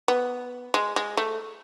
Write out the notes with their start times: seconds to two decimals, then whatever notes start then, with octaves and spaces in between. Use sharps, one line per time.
0.08 B3
0.74 G#3
0.96 G#3
1.17 A3